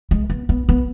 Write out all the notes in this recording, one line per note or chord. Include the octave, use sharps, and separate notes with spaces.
G#3
B3
B3
B3